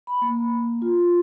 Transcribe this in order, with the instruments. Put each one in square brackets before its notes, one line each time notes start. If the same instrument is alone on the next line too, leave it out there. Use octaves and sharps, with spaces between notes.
[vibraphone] B5
A#3
F4